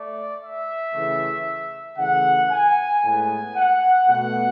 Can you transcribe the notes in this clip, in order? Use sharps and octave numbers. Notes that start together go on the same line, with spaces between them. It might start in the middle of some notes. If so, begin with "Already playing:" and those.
Already playing: A3 D5
E5
C#3 E3 A3
C#3 E3 A3 F#5
G#5
A2 G#3 B3 G#5
F#5
B2 A3 F#5